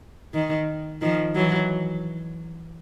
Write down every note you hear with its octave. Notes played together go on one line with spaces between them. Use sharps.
D#3
D#3 F3
E3 F#3